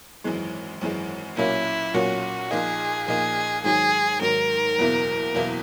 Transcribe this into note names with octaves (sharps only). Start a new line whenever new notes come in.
G#1 F#2 E3 G#3
G#1 F#2 E3 G#3
B1 A#2 F#3 A#3 C#4 E4
B1 A#2 F#3 A#3 C#4 F#4
A#1 A#2 A#3 D#4 G#4
A#1 A#2 A#3 D#4 G#4
G#2 D#3 F#3 G#4
G#2 D#3 F#3 A#4
F#1 E2 B2 A#3 E4
F#1 E2 B2 A#3 E4